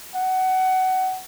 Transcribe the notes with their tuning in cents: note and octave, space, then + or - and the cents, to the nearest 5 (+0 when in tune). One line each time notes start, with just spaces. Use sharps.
F#5 +20